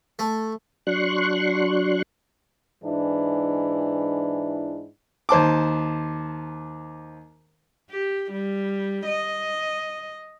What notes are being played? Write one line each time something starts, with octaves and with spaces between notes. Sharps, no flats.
A3
F#3 D4 C6 C#6 F#6
G#2 E3 D4 E4
D#2 C5 A5 D6
G4
G3
D#5